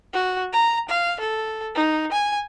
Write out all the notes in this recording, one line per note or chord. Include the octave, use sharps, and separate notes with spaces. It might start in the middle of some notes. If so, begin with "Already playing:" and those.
F#4
A#5
F5
A4
D#4
G#5